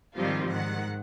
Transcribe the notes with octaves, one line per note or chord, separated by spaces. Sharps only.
G#2 D#3 F3 G3 C4 F4
G#2 D#3 F#5